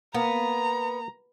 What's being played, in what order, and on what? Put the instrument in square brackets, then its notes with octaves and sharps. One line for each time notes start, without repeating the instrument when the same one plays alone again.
[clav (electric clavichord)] A#3 [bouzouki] B3 [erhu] A#5